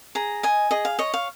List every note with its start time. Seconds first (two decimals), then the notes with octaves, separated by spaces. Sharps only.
0.15 G#4 A#5
0.43 D#5 G#5
0.71 G#4 D#5
0.85 F5
0.99 C#5 D#5
1.14 F5